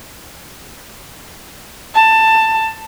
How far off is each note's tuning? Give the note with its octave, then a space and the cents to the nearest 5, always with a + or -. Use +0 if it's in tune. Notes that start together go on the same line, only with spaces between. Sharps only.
A5 +15